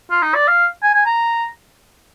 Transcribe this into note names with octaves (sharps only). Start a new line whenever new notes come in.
F4
D#4
D5
F5
G#5
G#5
A#5